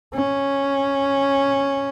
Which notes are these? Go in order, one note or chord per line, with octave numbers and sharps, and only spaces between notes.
C#4